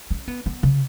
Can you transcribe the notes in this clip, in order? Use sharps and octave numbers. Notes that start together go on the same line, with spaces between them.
C#4
B3
B3
C#3